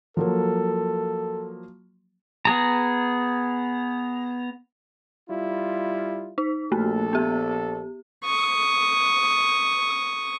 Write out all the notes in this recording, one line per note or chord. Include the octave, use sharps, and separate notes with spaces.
F3 F#3 A#3 A4
B3 G#4 A#5
G3 E4 F4
D#4
A#1 A3 A#3 A4
B3 G4
C#6 D#6